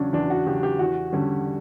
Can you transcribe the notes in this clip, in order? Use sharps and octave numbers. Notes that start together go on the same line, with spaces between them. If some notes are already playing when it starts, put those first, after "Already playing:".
Already playing: E2 C#3 F#3 C#4 D4
E2 D4
F#4
C#3 F#3 G4
G4
E2 F#4
D3 G3 C#4